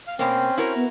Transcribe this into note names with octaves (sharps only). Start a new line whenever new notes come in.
F5
B2 A#3 C4 C#4 G5
E4 F#4 A#4
B3